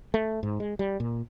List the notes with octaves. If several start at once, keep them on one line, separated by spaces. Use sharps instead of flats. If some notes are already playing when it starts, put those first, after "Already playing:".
A3
G#2
G#3
G3
A#2